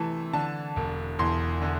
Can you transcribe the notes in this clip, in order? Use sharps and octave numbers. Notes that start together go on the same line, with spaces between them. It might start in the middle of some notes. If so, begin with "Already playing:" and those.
Already playing: C3 E3 A3 A5
D3 A5
E1
E2 C6
D3